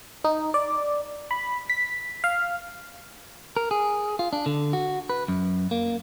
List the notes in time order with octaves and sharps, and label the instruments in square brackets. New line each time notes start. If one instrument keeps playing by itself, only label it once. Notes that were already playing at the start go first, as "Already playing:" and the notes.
[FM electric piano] D#4
D5
B5
B6
F5
[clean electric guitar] A#4
G#4
F4
D4
D3
F#4
B4
F#2
A#3